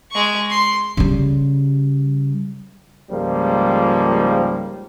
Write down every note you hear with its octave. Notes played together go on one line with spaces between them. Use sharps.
G#3 C#6
C6
C#3 G3
C#2 G#2 F3 G3 A#3